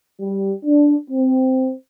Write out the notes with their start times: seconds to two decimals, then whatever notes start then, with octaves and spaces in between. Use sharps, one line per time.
0.20 G3
0.64 D4
1.09 C4